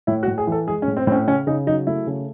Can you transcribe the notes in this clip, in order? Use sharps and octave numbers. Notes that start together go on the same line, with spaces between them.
A2 E4
F#4
A2
G#4
E3 A4
G#3 G#4
C#4
A2
C4
A2 C4
C#4
C#3 C#4
C#3 D#4
F#3 D#4
A3 E4
C#3